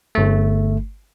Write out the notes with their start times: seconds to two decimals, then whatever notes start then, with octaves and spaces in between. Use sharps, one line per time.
0.15 G1 A3